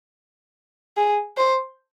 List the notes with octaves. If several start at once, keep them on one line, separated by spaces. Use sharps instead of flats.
G#4
C5